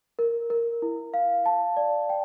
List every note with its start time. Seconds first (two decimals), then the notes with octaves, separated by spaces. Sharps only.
0.19 A#4
0.50 A#4
0.82 E4
1.14 F5
1.46 A5
1.77 D5
2.10 G5